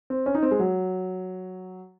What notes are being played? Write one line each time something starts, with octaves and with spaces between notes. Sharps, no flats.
C4
C#4
D#4
C4
G#3
F#3